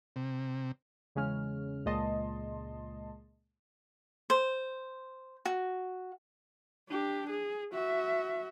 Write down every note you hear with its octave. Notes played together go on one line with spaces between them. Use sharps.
C3
E2 C#3 G#3 C#4 F6
C#2 A#2 G#3 D#5 A5 C6
C5
F#4
D4 G4
G#4
F#4 E5